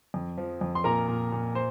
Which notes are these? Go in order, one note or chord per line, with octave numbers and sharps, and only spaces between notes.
F2
F3
F2
C6
A#2 A#4 A#5
A#2
A#2
C5